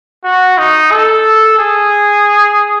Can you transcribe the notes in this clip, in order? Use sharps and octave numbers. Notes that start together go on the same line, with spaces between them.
F#4
D#4
A4
G#4